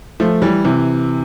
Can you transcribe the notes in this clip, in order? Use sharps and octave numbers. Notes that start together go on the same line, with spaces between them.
F3 A3
E3 G3
C3 E3